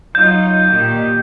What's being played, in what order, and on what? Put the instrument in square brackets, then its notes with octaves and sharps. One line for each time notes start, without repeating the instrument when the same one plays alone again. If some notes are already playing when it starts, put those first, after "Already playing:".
[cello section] F#3 D#4 F4 [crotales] G6
[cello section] A#2 D#3 G4